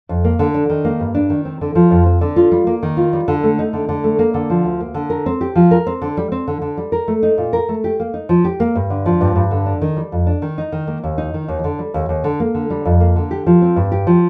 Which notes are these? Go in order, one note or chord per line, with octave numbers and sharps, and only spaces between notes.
F2
A#3
D3
D4
D#3
A#3
G2
D4
D#3
C4
D3
F3
F2
C4
D3
F4
G3
A#3
D#3
F4
G3
D3
A3
D#4
D3
D3
A3
A#3
D3
F3
D2
A#3
D3
A#4
C4
G4
F3
A#4
C4
D3
G3
C4
D3
D3
G3
A#4
A3
D#4
A#2
A#4
A3
G4
A#3
D#4
F3
G4
A#3
G2
D3
F3
G2
G2
D3
D4
D#3
G3
F2
D4
D#3
D#4
D#3
A#3
D#2
D#4
D#3
D#2
D3
G3
D#2
D#2
D3
A#3
D3
G3
F2
A#3
D3
G4
F3
C4
G2
G4
F3